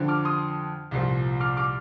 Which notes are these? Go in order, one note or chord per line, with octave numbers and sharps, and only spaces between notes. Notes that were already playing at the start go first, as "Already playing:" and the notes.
Already playing: F2 D3 F3
D6 F6
C6 D#6
C2 A#2 F3
D6 F6
D6 F6